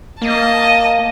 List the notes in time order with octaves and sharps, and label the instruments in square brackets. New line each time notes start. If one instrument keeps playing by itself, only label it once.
[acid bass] A#3 [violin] D#5 A5